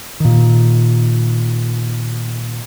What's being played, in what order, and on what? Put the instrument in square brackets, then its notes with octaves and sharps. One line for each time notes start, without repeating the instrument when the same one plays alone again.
[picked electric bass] A#2 D#3